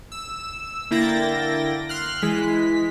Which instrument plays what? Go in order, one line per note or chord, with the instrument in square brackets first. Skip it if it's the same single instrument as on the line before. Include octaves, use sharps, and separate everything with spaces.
[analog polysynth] E6
D3 A#3 E4 G5 A6 A#6
C6 F6 F#6
E3 G#3 B6